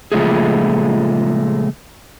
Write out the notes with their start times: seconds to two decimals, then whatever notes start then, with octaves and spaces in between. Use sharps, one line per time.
0.12 A#2 C#3 F3 G#3 A3 G#4